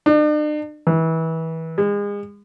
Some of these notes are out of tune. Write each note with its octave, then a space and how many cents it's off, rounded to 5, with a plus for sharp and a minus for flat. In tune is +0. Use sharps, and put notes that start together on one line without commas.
D4 +45
E3 -25
G#3 -35